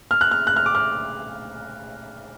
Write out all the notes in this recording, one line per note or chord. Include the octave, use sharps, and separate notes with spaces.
F6
F#6
F6
F#6
F6
D6
F6